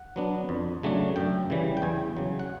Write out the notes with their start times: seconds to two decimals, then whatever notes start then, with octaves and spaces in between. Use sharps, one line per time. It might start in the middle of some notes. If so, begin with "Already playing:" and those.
Already playing: F#5
0.16 F#3 B3 D4
0.49 F2
0.83 C#3 F#3 A3 D4
1.16 F#2 G5
1.50 C#3 E3 G3
1.77 G5
1.82 E2 G#5
2.17 C#3 F#3
2.39 F#5